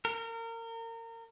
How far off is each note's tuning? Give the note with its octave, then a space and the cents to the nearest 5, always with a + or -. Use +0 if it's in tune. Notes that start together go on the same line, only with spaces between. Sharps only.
A#4 -30